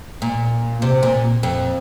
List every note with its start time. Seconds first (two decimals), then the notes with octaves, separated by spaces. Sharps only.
0.22 A#2
0.82 C3
1.03 A#2
1.43 F2